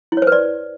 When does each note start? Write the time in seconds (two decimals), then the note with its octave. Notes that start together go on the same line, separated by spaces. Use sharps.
0.12 E4
0.17 C#5
0.22 C5
0.27 B4
0.32 D5